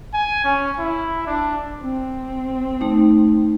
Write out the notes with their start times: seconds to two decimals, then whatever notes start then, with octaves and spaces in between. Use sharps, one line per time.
0.13 G#5
0.44 C#4
0.79 E4
1.27 D4
1.82 C4
2.81 A3 D#4